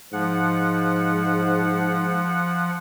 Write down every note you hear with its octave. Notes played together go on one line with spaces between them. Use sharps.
G#2 F3 F#5